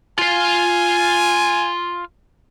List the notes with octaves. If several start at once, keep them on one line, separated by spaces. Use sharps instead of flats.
F4 F5 G#5